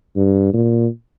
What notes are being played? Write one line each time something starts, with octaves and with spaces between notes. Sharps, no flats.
G2
A#2